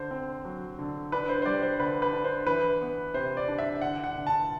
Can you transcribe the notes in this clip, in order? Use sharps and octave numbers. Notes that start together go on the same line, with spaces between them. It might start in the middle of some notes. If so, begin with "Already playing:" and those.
Already playing: D3 C5
C4
F#3
D3
D4 B4
C5
C5
G3 D5
C5
D3 B4
B4
D4
C5
E3 B4
B3
C3 C5
D5
D4
E5
D3 F#5
F#5
D3
A5